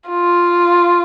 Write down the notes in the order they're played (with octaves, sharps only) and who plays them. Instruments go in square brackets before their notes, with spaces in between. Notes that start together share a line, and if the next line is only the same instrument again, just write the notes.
[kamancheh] F4